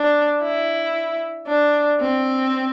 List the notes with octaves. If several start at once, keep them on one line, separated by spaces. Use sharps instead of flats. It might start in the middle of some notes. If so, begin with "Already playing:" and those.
Already playing: D4
E4
D4
C4